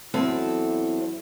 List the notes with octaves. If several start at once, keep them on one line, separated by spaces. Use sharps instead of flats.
E2 F#3 C4 E4 A4